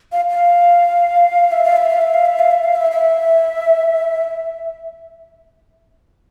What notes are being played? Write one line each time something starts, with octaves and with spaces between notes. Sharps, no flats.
F5
F5
E5
F5
E5
F5
E5
F5
E5
F5
E5
F5
E5
E5